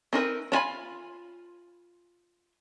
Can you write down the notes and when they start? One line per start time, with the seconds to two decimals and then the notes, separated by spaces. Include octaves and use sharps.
0.13 C4 D#4 A#4 B4
0.52 D4 F4 G#5 B5